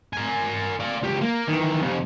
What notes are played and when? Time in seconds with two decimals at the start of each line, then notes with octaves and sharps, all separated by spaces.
0.13 A#4 G#5
0.80 D5 F5
1.03 C#2 G4
1.22 A#3
1.48 D#3 E3
1.81 F2 C3